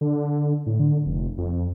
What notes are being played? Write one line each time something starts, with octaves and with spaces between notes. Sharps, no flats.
D3
A2
D3
F1
F2